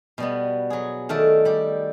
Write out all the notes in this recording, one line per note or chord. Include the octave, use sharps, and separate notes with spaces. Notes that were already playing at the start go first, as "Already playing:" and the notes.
B2 G3 B3
F#3 G#4
D#3 A3 A4 D5
G3 G4